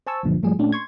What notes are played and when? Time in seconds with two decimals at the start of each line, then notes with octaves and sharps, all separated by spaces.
0.07 C5 G#5 A5 C#6 E6
0.23 C#2 F#2 A#2 D3 F3
0.43 G#2 F3 G3 A3 G#4
0.59 A#2 A3 C#4 D4
0.72 C6 C#6 G#6